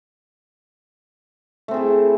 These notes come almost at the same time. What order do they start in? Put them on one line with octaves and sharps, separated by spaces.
A3 C4 G#4 E4